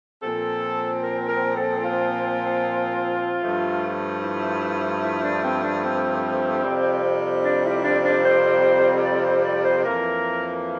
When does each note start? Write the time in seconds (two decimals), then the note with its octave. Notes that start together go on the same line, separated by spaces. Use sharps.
0.22 A#2 F3 C4 A4
1.03 A#4
1.29 A#4
1.56 A4
1.84 F4
3.43 G2 F3 A3
4.23 E4
5.03 E4
5.24 D4
5.44 C4
5.64 D4
5.83 C4
6.64 F2 C3 G3
7.44 D4
7.64 E4
7.84 D4
8.04 D4
8.24 C5
9.04 D5
9.25 C5
9.45 D5
9.65 C5
9.84 F2 E3 A#3 A#4